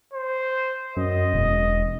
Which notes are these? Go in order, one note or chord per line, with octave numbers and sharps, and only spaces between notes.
C5
F#2 D#5
E1